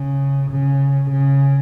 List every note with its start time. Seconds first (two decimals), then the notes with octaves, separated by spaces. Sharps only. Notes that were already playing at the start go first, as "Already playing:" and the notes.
Already playing: C#3
0.51 C#3
1.11 C#3